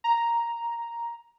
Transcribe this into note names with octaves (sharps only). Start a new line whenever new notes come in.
A#5